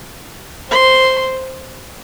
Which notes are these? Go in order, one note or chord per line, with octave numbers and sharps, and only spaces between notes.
C5 C6